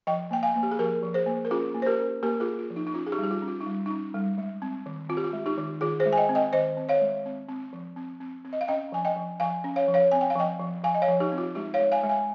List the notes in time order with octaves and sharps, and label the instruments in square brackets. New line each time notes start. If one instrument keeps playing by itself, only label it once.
[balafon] F3 D#5 G5
A#3 G5
F5 G#5
A#3
G4
G#4
F3 G4 A#4
F3
G#4 C5
A#3
A#4
C#4 F4 G#4
A#3
C5
G4 A#4
C#4
A#3 G4 A#4
F4 G#4
A#3
F4
F3
D#4
D#4
C#4 F4
G#4
D#4 G4
G3
G4
F4
C#4
F4
D#4
G3
C#4 D#4
G3
G#3
C4
D#3
C4 F4
G4
F4
G#3
D#4 G4
D#3
D#3 F4 G#4
G#4 C5
G#3
G#5
D#5 G5
C4
D#5 G5
D#3 C5 D#5
C4
C#5 F5
G#3
C4
C4
F3
C4
C4
C4
D#5
F5
C#4 D#5 G5
F3 G#5
D#5 G5
F3
F3 F5 G#5
C#4
C#5 F5
F3
C#5 F5
C4 G#5
G5
F5
F3 D#5 G5
F3
F3 F5 G#5
D#5
C#5 F5
F3
D#4 G4
C4
F4
G#3 D#4 G4
C#5 F5
G#3
F5 G#5
G#3
F5 G#5